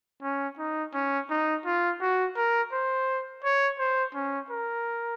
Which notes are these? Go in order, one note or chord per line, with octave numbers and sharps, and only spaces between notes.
C#4
D#4
C#4
D#4
F4
F#4
A#4
C5
C#5
C5
C#4
A#4